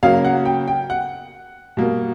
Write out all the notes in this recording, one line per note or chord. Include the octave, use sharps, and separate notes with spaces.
C#3 F#3 A#3 F5
F#5
G5
G5
F#5
B2 G3 A#3